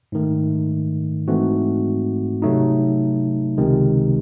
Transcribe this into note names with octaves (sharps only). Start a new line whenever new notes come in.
G#2 D#3 A3
G#2 E3 A3 C4 F#4
C3 F#3 A3 D#4
C#2 C3 D#3 G#3